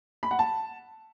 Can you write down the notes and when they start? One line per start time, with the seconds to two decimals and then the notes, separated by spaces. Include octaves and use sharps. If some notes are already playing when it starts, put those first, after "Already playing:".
0.23 B5
0.31 F#5
0.39 A5